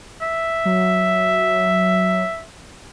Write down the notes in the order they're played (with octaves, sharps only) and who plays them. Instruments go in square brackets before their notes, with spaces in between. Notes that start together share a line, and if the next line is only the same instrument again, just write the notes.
[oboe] E5
[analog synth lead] F#3